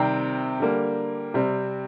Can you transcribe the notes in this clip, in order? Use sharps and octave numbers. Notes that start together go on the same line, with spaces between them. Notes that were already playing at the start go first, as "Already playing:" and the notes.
Already playing: C3 D#3 G3 C4 G5 A#5
D3 G3 A#3
C3 G3 C4